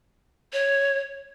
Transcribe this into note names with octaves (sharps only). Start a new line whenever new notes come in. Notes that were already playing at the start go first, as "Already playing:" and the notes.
C#5